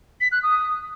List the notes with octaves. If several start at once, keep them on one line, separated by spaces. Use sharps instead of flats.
B6
F#6
D#6